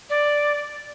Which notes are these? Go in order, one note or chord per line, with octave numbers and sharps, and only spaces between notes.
D5